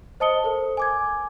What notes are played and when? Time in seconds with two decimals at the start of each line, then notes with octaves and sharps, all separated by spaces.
0.20 C5 D#5 A5 D#6 C#7 G7
0.44 A4 A#4 C5
0.77 G#5 D6 G#6